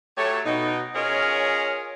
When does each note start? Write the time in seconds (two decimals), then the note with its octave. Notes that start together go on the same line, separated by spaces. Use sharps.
0.18 F#3 A3 G4 A4 C#5
0.45 B2 D#4
0.95 C#4 F4 G#4 A#4 C#5 D#5